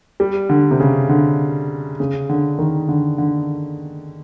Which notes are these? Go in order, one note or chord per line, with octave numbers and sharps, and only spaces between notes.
G3
D3
C3
C#3
D3
C#3
D3
D#3
D3
D3